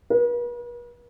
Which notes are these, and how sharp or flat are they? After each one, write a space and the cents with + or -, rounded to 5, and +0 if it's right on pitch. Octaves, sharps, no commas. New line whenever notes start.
B4 -45